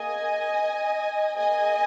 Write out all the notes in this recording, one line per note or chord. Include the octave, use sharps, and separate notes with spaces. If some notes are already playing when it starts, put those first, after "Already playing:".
Already playing: A#3 G#4 D#5 G#5
A#3 G#4 D#5 G#5